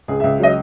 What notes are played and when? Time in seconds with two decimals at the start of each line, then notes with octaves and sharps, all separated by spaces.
0.08 C#2 G#4
0.20 C#2 E5
0.40 F#3 D#5